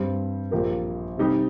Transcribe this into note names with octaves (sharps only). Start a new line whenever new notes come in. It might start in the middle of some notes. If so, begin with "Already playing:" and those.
Already playing: G2 G3 C4
A#1 A#2 A#3 G4 A#4
C3 G3 D#4 G4